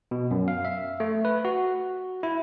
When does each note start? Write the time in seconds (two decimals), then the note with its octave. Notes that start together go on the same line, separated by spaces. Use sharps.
0.11 B2
0.31 F#2
0.48 F5
0.65 E5
1.00 A3
1.25 B4
1.45 F#4
2.23 E4